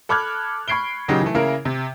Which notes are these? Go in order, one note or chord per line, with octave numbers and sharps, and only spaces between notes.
A4 B5 D6 F6 F#6 G#6
B5 C#6 G#6 C7 D7 G7
A#2 C#3 F#3 D#4 G4
E3 A3
C#3 A#3 E4 A#4
C3